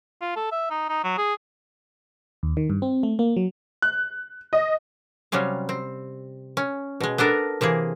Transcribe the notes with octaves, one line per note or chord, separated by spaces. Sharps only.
F4
A4
E5
D#4
D#4
F#3
G#4
D#2
D#3
G2
C4
A3
A#3
F#3
F#6
D#5
C3 F#3 G3 C#4 F5
C4
C#4
B2 G#3
B3 D4 A4 A#4
C3 E3 A#3 G#4